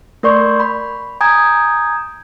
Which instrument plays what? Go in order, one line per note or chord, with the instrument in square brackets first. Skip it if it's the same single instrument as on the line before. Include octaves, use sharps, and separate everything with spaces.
[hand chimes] A3 A#4 D5 C6 C#6 G6
B5
G#5 A#5 D#6 G6 G#6